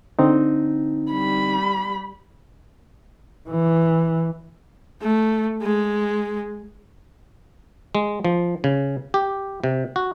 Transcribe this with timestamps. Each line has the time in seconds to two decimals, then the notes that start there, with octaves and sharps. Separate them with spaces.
0.19 D3 C4 D#4
1.11 G3 B5
3.49 E3
5.02 A3
5.62 G#3
7.95 G#3
8.25 F3
8.64 C#3
9.14 G4
9.64 C3
9.96 F#4